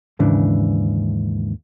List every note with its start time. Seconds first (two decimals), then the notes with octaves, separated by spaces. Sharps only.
0.19 D#2 G#2 C#3 E3 D4